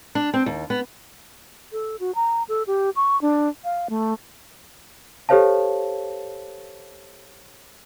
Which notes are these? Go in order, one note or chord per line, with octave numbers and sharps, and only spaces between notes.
D4
C4
D#2
B3
A4
F#4
A#5
A4
G4
C#6
D4
F5
A3
G4 A4 C5 C#5 F5 A5